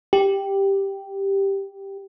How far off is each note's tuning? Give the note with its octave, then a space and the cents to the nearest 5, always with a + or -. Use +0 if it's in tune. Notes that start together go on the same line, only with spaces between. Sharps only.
G4 +0